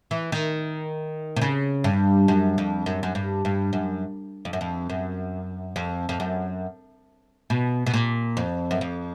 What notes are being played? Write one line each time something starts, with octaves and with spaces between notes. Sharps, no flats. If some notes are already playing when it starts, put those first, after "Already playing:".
E3
D#3
C3
C#3
G2
F#2
F2
F#2
F#2
G2
G2
F#2
F2
F#2
F2
F#2
F2
F2
F#2
B2
B2
A#2
F2
F#2
F2